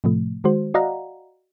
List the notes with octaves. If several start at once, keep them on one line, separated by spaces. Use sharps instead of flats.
A2 C3 F3 A3
D#3 G#3 F#4 C5
F#4 D5 D#5 F5 F#5 A#5